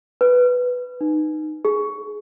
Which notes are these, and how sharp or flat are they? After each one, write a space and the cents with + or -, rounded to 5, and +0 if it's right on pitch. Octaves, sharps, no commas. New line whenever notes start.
B4 +0
D#4 -15
G#4 +15